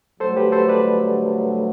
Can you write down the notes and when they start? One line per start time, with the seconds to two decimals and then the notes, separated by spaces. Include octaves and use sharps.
0.20 G2 D3 F#3 A3 A4 C5
0.36 G4 B4
0.52 A4 C5
0.68 B4 D5